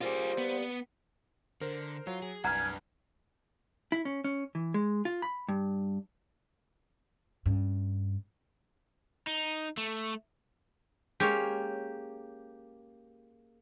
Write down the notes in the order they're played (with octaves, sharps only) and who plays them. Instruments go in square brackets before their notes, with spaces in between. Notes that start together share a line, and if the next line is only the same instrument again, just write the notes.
[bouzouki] G3 A#3 [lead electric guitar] F4 G#4 [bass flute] C5
[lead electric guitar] B3
[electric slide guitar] D3 [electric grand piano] A#4 C5
[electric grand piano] F#3 [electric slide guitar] F4
[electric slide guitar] G#4
[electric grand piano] C2 F6 [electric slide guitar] F#2 D4 B4 [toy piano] F#5 A#5 [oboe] G#5
[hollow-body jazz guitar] E4
C#4
C#4
E3
G#3
F4
B5
G2
[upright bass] G2 C#4
[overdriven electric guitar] D#4
A3
[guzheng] G#3 C#4 C#5 [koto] A#3 G4